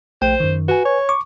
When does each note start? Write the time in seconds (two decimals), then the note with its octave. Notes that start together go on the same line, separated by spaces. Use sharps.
0.22 A#1 A3 C5 G5
0.40 F#2 D#3
0.68 F#4 B4 G#5
0.85 C#5
1.09 C#6 D6